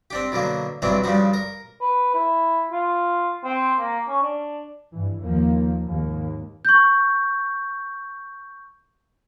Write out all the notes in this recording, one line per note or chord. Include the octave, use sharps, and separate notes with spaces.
C4 D4 G4
B2 D3 F#3 A#3
G2 B2 E3 F#3 C4 D4
G2 C#3 F3 G3 F#4
A#4
B4
E4
F4
C4
A#3
C#4
D4
G2 E3
D#2 F3 A#3
D#2 G#2 A#3
C#6 G6